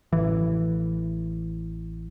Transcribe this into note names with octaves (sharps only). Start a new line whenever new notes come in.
A1 E3